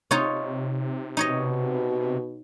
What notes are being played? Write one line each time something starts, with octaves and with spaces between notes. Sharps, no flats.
C3 D#4 F4 C#5
B2 D#4 C#5 D#5